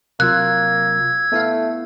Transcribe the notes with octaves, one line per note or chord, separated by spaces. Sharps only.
C3 F#3 A#3 F4 E6 F#6 G#6
A3 B3 E4 F5